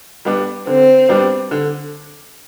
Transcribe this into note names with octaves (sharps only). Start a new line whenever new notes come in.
G3 B3 D4
D3 C4
G3 B3 D4
D3